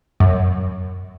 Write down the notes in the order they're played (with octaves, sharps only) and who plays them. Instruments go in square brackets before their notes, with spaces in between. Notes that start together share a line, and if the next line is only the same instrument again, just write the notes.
[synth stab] F#2